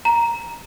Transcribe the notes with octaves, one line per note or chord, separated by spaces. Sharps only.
A#5